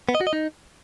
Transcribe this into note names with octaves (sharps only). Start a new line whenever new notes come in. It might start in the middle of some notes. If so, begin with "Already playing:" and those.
B3
D#5
F#4
D#5
D#4